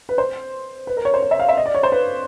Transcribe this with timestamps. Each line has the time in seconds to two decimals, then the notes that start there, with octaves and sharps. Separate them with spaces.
0.09 B4
0.18 C5
0.87 B4
0.97 A#4
1.05 C#5
1.14 C5
1.22 C#5
1.31 E5
1.40 F5
1.49 E5
1.57 D#5
1.66 D5
1.75 C#5
1.83 C5
1.92 B4